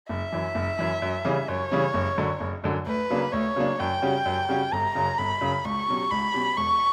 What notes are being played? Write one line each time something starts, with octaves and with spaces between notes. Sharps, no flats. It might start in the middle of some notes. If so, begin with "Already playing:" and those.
F#1 E5
F#2 E3
F#1
F#2 E3
F#2
C#3 E3 G3 C#4
F#2 C#5
C#3 E3 G3 C#4
F#1
F#2 D3 F#3
F#1
F#2 D3 F#3
D2 B4
C#3 F#3 A#3 D4
D2 C#5
C#3 F#3 A#3 D4
F#2 G5
C#3 G3 C#4 F#4
F#2
C#3 G3 C#4 F#4
G1 A#5
F#2 C#3
G1 B5
F#2 C#3
C#2 C#6
B2 F#3 C#4 G4
C#2 B5
B2 F#3 C#4 G4
E1 C#6